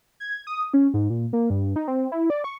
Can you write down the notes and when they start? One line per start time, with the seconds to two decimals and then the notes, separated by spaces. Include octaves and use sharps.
0.20 G#6
0.47 D#6
0.74 C#4
0.94 G#2
1.10 A#2
1.33 A#3
1.50 G2
1.76 D#4
1.88 C4
2.12 E4
2.30 D5
2.44 C#6